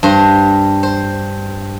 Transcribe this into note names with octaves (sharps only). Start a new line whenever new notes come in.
G2 C5
C5